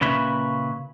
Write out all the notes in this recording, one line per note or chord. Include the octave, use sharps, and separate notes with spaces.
A#2 C#3 C#4 B4 E5